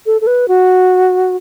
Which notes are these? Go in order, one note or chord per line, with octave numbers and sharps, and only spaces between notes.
A4
A4
B4
F#4